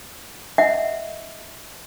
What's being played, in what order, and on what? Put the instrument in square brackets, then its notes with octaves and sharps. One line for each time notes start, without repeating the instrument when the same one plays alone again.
[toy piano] D#5 E5 F#5